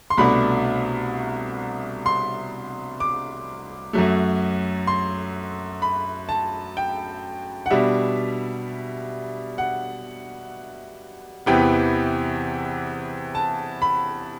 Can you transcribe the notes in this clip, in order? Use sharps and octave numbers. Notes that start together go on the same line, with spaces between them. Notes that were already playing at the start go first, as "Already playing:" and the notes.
C6
C2 B2 A3 D4 B5
C6
D6
F#2 F#3 A3
C6
B5
A5
G5
F#5
B2 G3 D4 E5
F#5
E2 C3 E3 B3 G5
A5
B5